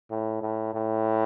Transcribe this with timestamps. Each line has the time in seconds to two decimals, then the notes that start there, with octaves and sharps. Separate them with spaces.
0.10 A2
0.42 A2
0.74 A2